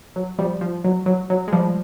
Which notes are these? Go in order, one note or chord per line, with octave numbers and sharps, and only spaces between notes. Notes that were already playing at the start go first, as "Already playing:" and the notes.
F#3
F3 G3
F3
F#3
F#3
F#3
G#3
F3 G3